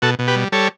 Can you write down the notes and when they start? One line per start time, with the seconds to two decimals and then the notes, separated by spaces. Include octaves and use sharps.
0.02 B2 F#4 A4
0.19 B2
0.27 G4 B4
0.35 G3
0.52 G3 A4 C#5